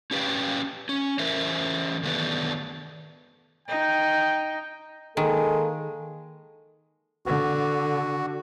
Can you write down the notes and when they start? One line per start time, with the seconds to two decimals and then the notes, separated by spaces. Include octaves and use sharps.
0.11 C#4 G4 B4 F5 G5
0.89 C#4
1.19 E3 C#4 A#4 C5 E5
2.03 D#3 A3 B3 D4 B4
3.68 D#4 G5
5.17 D#3 G#3 A#3 A4
7.26 D3 F#4